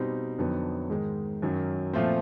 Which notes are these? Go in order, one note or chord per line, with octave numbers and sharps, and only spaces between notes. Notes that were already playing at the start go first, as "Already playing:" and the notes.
Already playing: B2 G3 C4 D#4
F2 D3 F#3 B3 D#4
G#2 D#3 G#3
F#2 D#3 F#3
A#2 F3 A3 C4